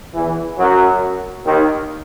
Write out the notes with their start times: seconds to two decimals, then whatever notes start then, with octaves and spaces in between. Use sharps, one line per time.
0.14 E2 E3
0.58 F#2 F#3
1.46 D#2 D#3